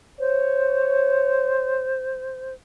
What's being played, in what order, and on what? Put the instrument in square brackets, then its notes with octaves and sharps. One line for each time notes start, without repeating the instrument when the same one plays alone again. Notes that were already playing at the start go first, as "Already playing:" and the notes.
[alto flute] C5 [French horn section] C#5